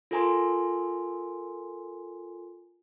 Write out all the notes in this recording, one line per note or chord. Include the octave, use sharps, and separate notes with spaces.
F4 A4 A#4 G#5 A#5 C6